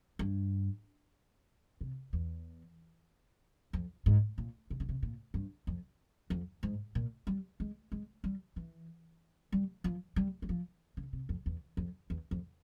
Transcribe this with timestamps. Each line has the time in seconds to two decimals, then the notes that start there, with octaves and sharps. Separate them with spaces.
0.19 G2
1.81 C3
2.13 E2
3.73 F2
4.06 G#2
4.38 A#2
4.70 C3
4.80 C#3
4.89 C3
5.03 A#2
5.34 G2
5.67 F2
6.30 F2
6.63 G#2
6.95 A#2
7.27 G3
7.60 G#3
7.92 G#3
8.24 G3
8.56 E3
9.52 G3
9.84 F3
10.16 G3
10.42 G3
10.49 F3
10.97 C#3
11.13 C3
11.29 F2
11.46 E2
11.77 F2
12.10 E2
12.31 F2